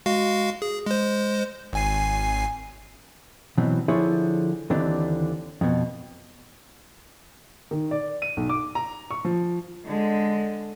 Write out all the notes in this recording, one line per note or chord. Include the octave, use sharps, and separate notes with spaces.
G#3 F#4 F5
G#4
G#3 C5
G#1 G#5 C7
B2 E3 F#3 C4
D3 F3 E4 G#4 C#5
D#2 D3 E3 C4 D4 D5
F2 B2
D#3
D5
D#7
B1
D6
A#5
C#6
F3
D3 G#3